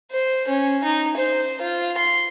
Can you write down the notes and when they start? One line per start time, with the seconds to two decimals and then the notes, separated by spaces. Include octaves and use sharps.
0.11 C5
0.48 C#4
0.84 D#4
1.17 C5
1.61 F4
1.98 C6